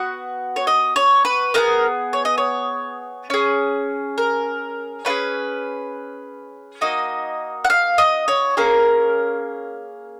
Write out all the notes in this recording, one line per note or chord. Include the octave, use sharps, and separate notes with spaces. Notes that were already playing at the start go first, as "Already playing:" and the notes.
Already playing: B3 F#4 F#5
C#5
D#5
C#5
B4
B3 D#4 G#4 A#4
C#5
D#5
C#5
C#4 G#4
A#4
C#4 F4 G#4 B4
A#3 D#4 F#4 D#5
F#5
F5
D#5
C#5
A#3 C#4 G#4 A#4